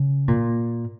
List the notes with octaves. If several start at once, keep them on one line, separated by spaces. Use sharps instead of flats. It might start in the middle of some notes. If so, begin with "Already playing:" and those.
Already playing: C#3
A#2